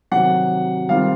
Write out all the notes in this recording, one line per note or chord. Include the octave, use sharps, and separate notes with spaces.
C3 D#3 F#3 F#5
D#3 G3 C4 F4 F5